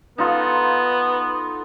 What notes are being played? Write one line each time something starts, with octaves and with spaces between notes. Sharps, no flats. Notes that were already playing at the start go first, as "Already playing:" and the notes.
B3 D#4 F4 A4